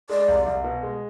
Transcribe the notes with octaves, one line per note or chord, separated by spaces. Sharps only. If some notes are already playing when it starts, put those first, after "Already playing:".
G#3 D5
C2
C2
B2
G#3